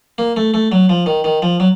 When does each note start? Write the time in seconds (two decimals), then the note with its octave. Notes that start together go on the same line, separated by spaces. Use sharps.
0.18 A#3
0.36 A3
0.54 A3
0.72 F#3
0.89 F3
1.06 D#3
1.24 D#3
1.42 F3
1.60 F#3